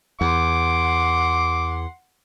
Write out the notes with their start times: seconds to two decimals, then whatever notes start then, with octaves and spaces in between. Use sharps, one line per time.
0.21 E2 F#5 C6 D6